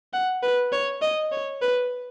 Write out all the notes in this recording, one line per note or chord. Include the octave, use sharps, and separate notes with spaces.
F#5
B4
C#5
D#5
C#5
B4